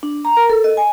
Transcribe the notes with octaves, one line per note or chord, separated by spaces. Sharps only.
D4
A#5
A#4
A4
D#5
G#5